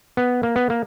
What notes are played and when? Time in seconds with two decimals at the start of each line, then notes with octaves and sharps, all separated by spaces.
0.17 B3
0.43 A#3
0.56 B3
0.70 A#3